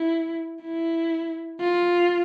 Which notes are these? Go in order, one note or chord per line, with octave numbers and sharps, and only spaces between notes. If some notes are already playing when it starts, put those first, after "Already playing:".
Already playing: E4
E4
F4